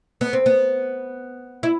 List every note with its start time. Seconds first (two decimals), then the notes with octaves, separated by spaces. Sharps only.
0.21 B3
0.33 C4
0.46 B3
1.63 E4